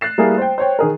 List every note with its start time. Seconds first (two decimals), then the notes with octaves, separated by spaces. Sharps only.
0.01 F#6 A6 C7 E7
0.18 G3 A3 A#3 E4 G#4
0.38 C5 G5
0.58 C5 C#5 G5
0.79 D#3 G#4 A#4